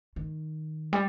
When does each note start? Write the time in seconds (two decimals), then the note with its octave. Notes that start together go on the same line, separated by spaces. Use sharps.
0.16 D#3
0.93 G3